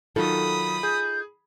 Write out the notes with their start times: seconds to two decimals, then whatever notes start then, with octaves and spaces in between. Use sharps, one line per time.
0.16 D#3 F#3 D#4 F4 A4 B5 D#6
0.83 G#4 G6